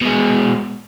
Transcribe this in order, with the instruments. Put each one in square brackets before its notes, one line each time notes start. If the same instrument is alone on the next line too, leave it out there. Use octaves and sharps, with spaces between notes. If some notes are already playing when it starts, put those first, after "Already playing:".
[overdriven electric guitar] B2 G#3